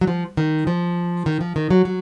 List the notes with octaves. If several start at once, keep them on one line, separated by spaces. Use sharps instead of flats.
F#3
F3
D#3
F3
D#3
F3
D#3
F#3
F#3